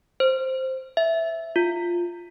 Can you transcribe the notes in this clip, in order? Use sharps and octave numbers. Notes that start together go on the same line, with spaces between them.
C5
E5
F4